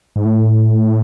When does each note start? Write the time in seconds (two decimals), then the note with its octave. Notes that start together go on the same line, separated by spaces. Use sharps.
0.16 G#2
0.25 A2